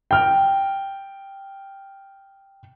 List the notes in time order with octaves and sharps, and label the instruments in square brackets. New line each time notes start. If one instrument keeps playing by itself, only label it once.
[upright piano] G5 F6